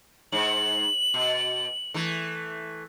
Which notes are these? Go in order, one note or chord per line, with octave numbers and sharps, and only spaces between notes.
G#2 F#7
B2
E3 A3